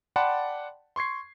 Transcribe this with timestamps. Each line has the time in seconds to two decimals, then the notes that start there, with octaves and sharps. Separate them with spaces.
0.16 D5 F#5 G5 A5 B5 C6
0.96 C6 C#6 G#6 C7